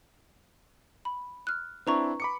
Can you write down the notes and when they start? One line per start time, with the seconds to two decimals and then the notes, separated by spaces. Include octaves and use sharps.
1.05 B5
1.47 F6 F#6
1.87 C4 D4 E4 B4 A#5 C#6
2.20 B5 D6 C#7